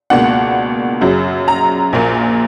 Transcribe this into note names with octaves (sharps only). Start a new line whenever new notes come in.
C#2 B2 A#3 D4 F#5
F#2 C#3 F#3
A#5
A#1 A#2 A#3